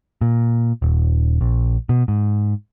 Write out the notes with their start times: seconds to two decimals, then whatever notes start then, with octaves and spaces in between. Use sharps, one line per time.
0.21 A#2
0.82 D#1
1.41 A#1
1.89 B2
2.08 G#2